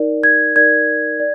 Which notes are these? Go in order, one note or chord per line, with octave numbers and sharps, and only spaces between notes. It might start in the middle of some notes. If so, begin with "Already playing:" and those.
Already playing: D#4 A#4 D5
G#6
D#4 A#4 D5 G#6
D5